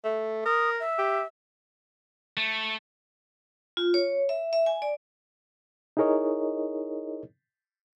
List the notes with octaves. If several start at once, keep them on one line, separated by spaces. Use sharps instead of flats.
A3
A#4 D#6
E5
G4
A3
F4
C#5
E5
E5
G#5
D5
D#4 E4 G#4 A#4 C#5 D#5